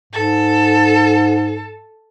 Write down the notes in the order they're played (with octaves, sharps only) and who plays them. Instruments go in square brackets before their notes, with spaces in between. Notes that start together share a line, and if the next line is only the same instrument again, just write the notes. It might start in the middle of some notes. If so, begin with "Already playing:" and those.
[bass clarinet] G#2 [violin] A4